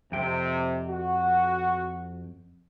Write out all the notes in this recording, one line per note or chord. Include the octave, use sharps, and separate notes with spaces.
F2 C3 G5
F#4